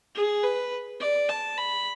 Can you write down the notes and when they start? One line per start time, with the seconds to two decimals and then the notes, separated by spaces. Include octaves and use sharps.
0.15 G#4
0.43 B4
1.00 D5
1.29 A5
1.58 B5